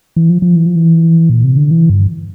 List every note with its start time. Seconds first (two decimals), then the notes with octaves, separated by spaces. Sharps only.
0.16 E3
0.30 F3
0.42 F3
0.56 E3
0.66 F3
0.76 E3
1.30 A#2
1.44 C3
1.57 D3
1.71 E3
1.90 G2